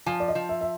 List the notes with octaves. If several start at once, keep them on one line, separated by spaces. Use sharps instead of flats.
F3 G#5
D5
D#5
F3
E5
E5